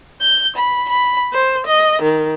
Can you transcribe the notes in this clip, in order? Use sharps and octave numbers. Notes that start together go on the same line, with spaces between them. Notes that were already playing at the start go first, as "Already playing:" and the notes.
G6
B5
B5
C5
D#5
D#3